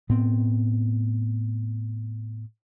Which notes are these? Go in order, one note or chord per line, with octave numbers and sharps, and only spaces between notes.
A2 B3 C4